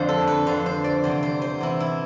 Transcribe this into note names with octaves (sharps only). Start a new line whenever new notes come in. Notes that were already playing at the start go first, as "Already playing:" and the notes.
Already playing: F2 D3 C5 D5
A4
B4
F2 D3 C5
C5
D5
E2 C3 E3 C5
C5
C5
E2 C3 E3 E4
E4